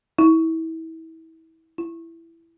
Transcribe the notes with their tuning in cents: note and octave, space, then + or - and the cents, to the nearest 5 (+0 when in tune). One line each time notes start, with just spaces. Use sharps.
E4 -30
E4 +10